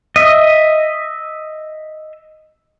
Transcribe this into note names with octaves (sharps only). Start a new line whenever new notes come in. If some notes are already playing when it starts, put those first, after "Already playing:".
D#5 E5